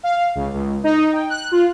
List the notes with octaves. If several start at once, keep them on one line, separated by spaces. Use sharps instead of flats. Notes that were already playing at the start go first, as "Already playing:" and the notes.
F5
C#2
C#2
D#4
G5
F#6
F4